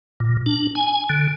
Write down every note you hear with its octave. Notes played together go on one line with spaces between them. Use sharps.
A#2
D4
G#5
D3